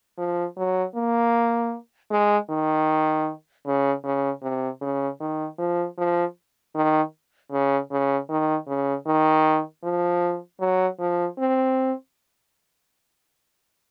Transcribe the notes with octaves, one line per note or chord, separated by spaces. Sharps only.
F3
F#3
A#3
G#3
D#3
C#3
C#3
C3
C#3
D#3
F3
F3
D#3
C#3
C#3
D#3
C#3
D#3
F3
F#3
F3
C4